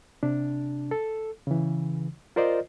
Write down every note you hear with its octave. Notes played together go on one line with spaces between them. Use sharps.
C3 D4
A4
C#3 E3
F4 A#4 C5 D5 D#5